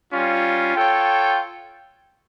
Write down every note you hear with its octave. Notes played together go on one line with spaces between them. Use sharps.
G3 C#4 F4
F4 A4 C#5 G5